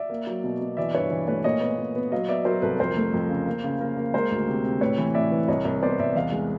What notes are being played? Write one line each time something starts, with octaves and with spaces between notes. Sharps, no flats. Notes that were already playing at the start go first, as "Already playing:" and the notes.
Already playing: D5 E5
A#3
F#3
B2
B2
E3 D5 E5
G2 B4 C#5
E3
A3 B4 C#5
A#2 C#5 D#5
B3
A#2
B3
F#3 D#5 F5
B3 D5 E5
F#3 A#4 C5
C2 A4 B4
F2 A#4 C5
A3
F2
C#3
A#3
C#3
A#3
A#3
G#3 A#4 C5
D2
C3
C3
A2 B4 C#5
E3
A2 D5 E5
E3
C2 C#5 D#5
C2 C#5 D#5
B3 C5 D5
C2 D5 E5
E2 D#5 F5
G#3